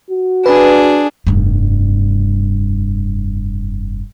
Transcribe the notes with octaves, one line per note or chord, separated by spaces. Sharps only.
F#4
D4 G#4 B4
F1 G2